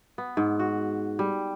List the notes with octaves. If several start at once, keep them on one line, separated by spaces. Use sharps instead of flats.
B3
G#2
F#4
G3